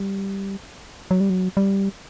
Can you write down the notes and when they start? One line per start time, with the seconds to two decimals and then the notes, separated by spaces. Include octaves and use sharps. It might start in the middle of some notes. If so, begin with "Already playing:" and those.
Already playing: G3
1.11 F#3
1.20 G3
1.30 F#3
1.57 G3